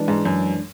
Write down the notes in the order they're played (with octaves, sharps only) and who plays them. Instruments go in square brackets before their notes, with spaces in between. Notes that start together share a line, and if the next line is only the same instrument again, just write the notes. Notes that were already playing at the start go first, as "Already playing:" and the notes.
Already playing: [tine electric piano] E3 G#3 D4
[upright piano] G#2
F#2